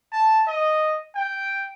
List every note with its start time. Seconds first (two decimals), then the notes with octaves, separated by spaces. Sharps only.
0.12 A5
0.47 D#5
1.15 G5